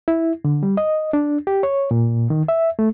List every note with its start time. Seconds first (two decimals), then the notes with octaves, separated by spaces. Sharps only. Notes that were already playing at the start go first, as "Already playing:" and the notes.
0.08 E4
0.45 D3
0.63 G3
0.77 D#5
1.13 D4
1.47 G4
1.63 C#5
1.91 A#2
2.30 D#3
2.48 E5
2.79 A3